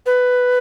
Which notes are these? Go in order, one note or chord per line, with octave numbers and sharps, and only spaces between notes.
B4